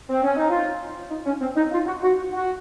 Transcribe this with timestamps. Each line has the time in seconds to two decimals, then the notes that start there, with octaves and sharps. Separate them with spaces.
0.10 C4
0.23 C#4
0.37 D#4
0.50 F4
1.10 D#4
1.26 C#4
1.41 C4
1.57 D#4
1.72 F4
1.87 F#4
2.02 F#4
2.33 F#4